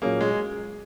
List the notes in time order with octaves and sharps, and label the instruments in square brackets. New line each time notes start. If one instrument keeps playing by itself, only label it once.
[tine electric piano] A#2 F#3 C#4 G#4 [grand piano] A#3
[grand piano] G#3